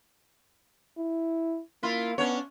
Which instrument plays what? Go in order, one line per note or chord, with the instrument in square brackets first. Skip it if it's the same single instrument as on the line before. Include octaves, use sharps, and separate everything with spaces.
[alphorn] E4
[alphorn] A#3 [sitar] E4 F4
[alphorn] B3 [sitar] C#4 D4 C#5